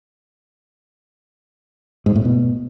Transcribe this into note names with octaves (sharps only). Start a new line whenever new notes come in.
G#2
A2
B2